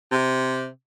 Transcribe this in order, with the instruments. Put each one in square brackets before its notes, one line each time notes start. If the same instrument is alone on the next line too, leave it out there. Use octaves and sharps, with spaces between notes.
[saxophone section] C3